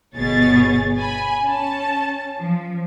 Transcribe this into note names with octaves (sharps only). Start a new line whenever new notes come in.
G1 B2 G#4 C#5 A6
G#5 B5
C#4 A5
F3